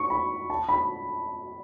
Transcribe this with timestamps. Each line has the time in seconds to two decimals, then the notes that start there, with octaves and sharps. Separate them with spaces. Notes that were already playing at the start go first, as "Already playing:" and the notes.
Already playing: C#6
0.10 B5
0.50 A5
0.69 B5